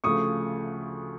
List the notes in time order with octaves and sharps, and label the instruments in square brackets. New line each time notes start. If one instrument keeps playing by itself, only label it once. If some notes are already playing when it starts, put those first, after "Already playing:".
[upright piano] D2 C#3 F3 A3 C#6 D#6